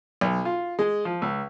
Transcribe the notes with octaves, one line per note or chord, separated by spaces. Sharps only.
B1
F4
G#3
F3
C#2